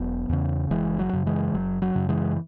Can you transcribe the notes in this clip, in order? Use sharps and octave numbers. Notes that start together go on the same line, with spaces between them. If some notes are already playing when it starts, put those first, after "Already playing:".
Already playing: E1 F#3 B3
E2 C#3
F#1 E3 G#3
F#3
F#2 C#3
E3 G#3
F#1 F#3
F#3
F#2 C#3
E3 G#3